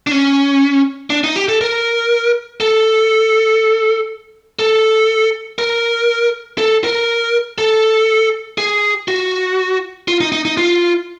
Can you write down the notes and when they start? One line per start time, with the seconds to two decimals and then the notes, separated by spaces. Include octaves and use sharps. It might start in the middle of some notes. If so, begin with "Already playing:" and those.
0.07 D4
0.11 C#4
1.10 D4
1.24 D#4
1.36 G4
1.48 A4
1.61 A#4
2.60 A4
4.59 A4
5.58 A#4
6.58 A4
6.84 A#4
7.58 A4
8.58 G#4
9.08 F#4
10.08 F4
10.21 D#4
10.32 D#4
10.45 D#4
10.57 F4